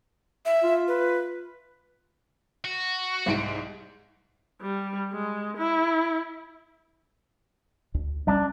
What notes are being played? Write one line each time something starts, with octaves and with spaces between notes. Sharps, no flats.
E5
F4
B4
F#4
C2 G#2 D7
G3
G#3
E4
D2
G3 G#3 C#4 D4